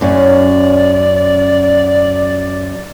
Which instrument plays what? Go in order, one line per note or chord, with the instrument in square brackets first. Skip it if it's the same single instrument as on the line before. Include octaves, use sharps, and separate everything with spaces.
[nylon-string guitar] F#2 C#4 [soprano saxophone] D5